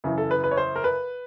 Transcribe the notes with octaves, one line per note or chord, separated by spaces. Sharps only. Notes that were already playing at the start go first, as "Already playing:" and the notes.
F#2 C#3 E3
A4
B4
B4
C#5
C5
A#4
B4